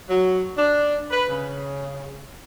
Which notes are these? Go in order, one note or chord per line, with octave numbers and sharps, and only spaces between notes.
F#3
D4
B4
C#3